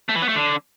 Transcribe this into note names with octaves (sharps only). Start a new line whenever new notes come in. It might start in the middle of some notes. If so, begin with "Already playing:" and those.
A3
E3
B3
A3
D3